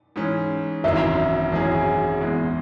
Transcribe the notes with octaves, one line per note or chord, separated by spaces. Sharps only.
G#2 E3 C#4
G#1 F#2 E3 E5
G#1 F#2 E3 C#4 G#4
E2 E3 G#3